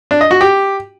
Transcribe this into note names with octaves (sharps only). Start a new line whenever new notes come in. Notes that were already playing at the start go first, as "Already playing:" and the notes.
D4
D#5
F#4
G4